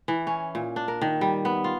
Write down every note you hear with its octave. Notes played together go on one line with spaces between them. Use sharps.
E3
C#4
A#2
D4
A#4
D#3
G3
B3
F4